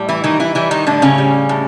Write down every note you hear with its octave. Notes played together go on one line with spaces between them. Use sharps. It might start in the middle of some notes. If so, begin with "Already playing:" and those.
Already playing: A2 G3
E3 E4
D#3 E3 D#4
E3 E4
E3 G3 E4
D#3 D#4
A2 D3 D4
C#3 C#4
G3
A2